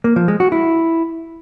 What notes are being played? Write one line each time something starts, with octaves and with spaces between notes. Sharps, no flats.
A#3
F3
G#3
F#4
E4